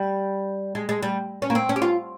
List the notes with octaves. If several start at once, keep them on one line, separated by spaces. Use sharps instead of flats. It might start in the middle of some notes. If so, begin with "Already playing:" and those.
Already playing: G3
G#3
G#3
G3
C#4
A#3
C4
C#4
G4
F4